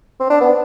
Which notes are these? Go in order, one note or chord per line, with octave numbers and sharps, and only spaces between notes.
C4
D4
B3